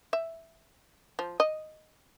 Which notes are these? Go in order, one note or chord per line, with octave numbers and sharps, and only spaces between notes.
E5
F3
D#5